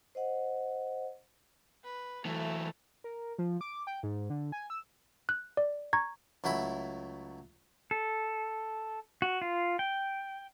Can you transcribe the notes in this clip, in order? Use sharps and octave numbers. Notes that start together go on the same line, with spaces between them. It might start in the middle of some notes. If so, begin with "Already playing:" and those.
C5 D#5 F#5
B4
E3 F#3 A3
A#4
F3
D6
G5
G#2
D3
G#5
E6
F#6
D5
A#5 C#6 G#6
C#2 F#3 A3 E4 B5
A4
F#4
F4
G5